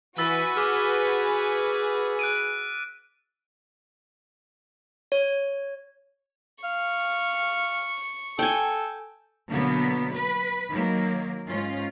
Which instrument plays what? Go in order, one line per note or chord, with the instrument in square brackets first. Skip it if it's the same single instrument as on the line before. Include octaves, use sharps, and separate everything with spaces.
[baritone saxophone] E3 [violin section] F#4 B4 G#5 [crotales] E6 A6 B6
[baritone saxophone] G#4 [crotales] D6 F6
[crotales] F#6 D7 D#7
[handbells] C#5
[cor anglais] F5 [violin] C#6
[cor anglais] A4 [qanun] G5 G#5
[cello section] B2 D3 F#3 A#3 B3
B4
D#3 F#3 A#3
G#2 C#4 F4